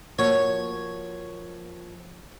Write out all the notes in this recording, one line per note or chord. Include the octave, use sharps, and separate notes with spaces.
F3 A#3 F#4 C#5